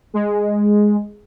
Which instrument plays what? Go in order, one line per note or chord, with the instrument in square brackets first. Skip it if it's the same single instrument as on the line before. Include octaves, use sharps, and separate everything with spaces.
[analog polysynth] G#3